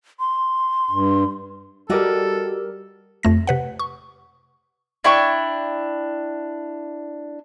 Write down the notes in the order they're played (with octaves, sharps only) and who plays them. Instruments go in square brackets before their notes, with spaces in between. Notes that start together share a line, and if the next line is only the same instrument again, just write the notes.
[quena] C6
[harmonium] G2
[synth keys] G3 G4 A#4 [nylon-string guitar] F#4 D5 D#5 [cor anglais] A4
[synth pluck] F2 A3 A#6
C3 B4 F#5
C#6
[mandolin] D4 E4 G5 C#6